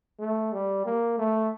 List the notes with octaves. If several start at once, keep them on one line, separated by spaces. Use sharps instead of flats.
A3
G3
A#3
A3